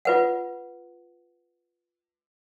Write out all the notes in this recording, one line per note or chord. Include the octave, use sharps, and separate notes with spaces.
F4 B4 F#5